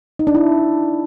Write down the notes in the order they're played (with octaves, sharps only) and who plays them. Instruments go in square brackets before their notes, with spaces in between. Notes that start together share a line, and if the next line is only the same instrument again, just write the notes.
[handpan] D#4
D4
E4